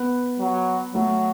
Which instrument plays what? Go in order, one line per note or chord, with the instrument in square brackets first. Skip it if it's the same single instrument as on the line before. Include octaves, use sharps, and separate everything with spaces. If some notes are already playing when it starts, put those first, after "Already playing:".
Already playing: [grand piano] B3
[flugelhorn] F#3
[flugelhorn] F#3 [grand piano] A3